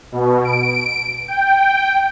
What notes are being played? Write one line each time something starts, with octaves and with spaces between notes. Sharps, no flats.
B2
D7
G5